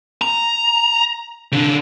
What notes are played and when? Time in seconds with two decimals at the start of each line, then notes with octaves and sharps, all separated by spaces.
0.21 A#5
1.52 C#3 D4